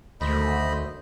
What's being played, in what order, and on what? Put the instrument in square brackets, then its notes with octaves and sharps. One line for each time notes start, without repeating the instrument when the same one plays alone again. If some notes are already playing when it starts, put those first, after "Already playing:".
[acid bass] D2 [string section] D#3 F#3 A3 [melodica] C5 D#5 B5